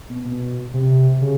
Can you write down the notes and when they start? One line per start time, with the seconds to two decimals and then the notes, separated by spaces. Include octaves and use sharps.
0.09 B2
0.25 B2
0.74 C3
1.21 C#3